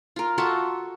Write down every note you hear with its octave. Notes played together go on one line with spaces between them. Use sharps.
F4 A#4
F4 F#4 A4 E5